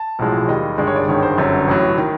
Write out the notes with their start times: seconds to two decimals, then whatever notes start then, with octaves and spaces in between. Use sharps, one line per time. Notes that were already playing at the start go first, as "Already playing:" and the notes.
Already playing: A5
0.19 B1 A2 F3 G#3
0.48 D#2 D#3 G3 D#5
0.78 G1 G2 D#3 G#3 D5
0.87 C#5
0.96 D5
1.08 G#1 G2 D#3 G#3 C#5
1.23 C5
1.38 G1 F#2 D3 C#5
1.67 A1 A2 F#3
1.98 D#3